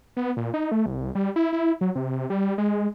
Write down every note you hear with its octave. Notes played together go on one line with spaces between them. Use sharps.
B3
A#2
D#4
A3
C2
G3
E4
E4
F#3
C3
G3
G#3